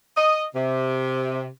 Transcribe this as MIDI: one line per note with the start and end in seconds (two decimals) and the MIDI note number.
0.16 0.44 75
0.55 1.46 48